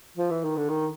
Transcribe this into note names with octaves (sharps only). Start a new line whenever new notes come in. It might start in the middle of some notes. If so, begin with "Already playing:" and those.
F3
E3
D#3
D3
D#3